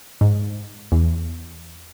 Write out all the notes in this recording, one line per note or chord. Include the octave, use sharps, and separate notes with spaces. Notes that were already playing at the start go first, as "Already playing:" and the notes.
G#2
E2